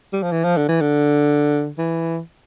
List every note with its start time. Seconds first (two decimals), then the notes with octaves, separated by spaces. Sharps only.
0.13 G3
0.23 F3
0.32 E3
0.44 F3
0.57 D3
0.69 E3
0.81 D3
1.78 E3